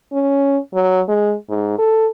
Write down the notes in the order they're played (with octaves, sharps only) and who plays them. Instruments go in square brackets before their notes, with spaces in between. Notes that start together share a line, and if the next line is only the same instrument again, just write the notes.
[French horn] C#4
F#3
G#3
G#2
A4